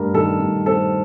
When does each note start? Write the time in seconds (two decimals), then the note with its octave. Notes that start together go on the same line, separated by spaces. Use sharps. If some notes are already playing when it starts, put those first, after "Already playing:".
Already playing: G2 A3 A#4
0.14 D#3 A4
0.40 G2
0.66 C4 A4